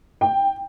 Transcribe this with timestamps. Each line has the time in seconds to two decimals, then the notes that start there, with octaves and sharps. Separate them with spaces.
0.21 G5